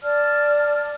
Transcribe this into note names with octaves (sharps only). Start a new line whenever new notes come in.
D5 A5 F6